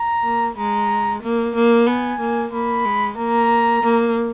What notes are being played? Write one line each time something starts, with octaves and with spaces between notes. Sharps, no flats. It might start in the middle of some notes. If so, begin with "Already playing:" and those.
Already playing: A#5
A#3
G#3 A#5
A#3
A#3
B3 G#5
A#3
A#3 B5
G#3
A#3 A#5
A#3